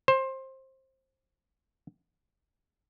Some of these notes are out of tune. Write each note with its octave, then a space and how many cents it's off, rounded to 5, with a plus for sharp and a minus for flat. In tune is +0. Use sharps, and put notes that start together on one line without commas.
C5 +20